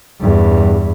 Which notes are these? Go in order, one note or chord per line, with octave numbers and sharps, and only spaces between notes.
E2 G2